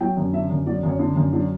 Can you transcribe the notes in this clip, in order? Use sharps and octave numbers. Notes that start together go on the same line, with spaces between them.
F#3 G5
F#2
D3 E5
F#2
F#3 D5
F#2
C#5
D3
F#2
F#3 D4